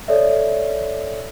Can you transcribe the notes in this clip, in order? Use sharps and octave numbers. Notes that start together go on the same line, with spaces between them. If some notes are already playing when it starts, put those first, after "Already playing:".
A4 C#5 D5 E5